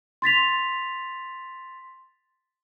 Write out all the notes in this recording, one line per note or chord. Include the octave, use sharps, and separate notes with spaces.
C6 A6 B6 F7